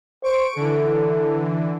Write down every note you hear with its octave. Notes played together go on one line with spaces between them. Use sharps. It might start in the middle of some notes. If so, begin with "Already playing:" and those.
C5 C#6 D7
D3 E3 A4